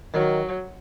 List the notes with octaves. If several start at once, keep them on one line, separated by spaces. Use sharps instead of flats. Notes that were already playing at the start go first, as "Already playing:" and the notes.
D#3 F#3